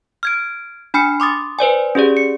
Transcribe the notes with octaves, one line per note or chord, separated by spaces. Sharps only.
F6 G#6 D7
D4 G#5 B5 F6 C7 C#7
C6 D6 D#6 A6
B4 C5 D5 G#5
C#4 G4 G#4 D5
C#7